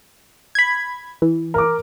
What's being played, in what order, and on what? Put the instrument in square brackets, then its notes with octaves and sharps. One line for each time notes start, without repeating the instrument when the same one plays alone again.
[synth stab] B5 G#6
E3
[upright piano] A#4 D6